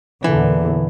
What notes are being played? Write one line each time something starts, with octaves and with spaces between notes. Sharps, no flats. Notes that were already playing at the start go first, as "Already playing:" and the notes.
E2 A#2 D3 E3